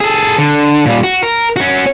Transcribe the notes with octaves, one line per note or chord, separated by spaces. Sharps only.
G#4 A4
D3
A#2 G3
F#4
A#4
C#4 F#4